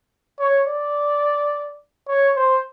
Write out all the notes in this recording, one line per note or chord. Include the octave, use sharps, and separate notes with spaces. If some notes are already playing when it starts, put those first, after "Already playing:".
C#5
D5
C#5
C5